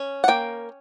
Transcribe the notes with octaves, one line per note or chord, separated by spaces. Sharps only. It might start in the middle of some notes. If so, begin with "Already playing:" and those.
Already playing: C#4
F#5
A#3 G5